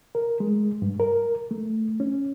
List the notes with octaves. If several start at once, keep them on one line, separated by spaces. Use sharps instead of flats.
A#4
G#3
G2
A#4
A3
C#4